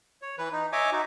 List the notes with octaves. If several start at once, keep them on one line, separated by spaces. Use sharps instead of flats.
C#5
E3 B4
D#4
C#5 D#5 E5 G#5 D6
D#4 F#4